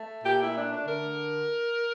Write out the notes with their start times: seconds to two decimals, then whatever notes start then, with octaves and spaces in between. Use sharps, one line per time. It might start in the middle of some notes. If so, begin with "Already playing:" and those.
Already playing: A3
0.24 A#2 G4
0.40 E4
0.54 A3 D4
0.71 D4
0.85 D3 A#4